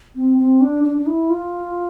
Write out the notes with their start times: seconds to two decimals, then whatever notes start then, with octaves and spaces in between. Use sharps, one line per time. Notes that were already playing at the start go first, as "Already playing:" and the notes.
0.16 C4
0.38 C4
0.61 D4
0.84 D4
0.98 D4
1.07 E4
1.30 F4